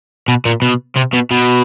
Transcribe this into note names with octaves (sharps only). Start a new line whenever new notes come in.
B2
A#2
B2
C3
B2
B2